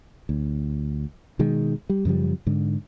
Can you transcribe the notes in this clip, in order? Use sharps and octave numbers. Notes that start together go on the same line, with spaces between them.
D2
B2 D#3 G#3
G3
F#2 C#3 F3 G3
G#2 D3